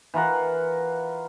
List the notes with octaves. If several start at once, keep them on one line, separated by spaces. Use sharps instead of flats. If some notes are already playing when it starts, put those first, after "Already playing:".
E3 F4 A#4 F#5